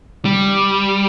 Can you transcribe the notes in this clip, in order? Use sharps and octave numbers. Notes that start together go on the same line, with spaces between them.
G3